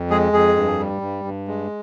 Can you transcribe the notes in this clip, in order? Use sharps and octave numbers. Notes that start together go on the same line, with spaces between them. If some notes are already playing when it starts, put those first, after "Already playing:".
Already playing: F2
G#3 G#4
F2 G#4
G2
G3
G2
G2
G#3